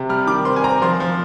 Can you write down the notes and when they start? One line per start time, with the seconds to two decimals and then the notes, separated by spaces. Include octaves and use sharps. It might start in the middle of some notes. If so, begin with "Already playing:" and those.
Already playing: C3
0.09 G3 F6
0.27 D#3 D6
0.45 C4 C6
0.56 G#5
0.64 C4 A#5
0.82 F3 C6
1.00 F3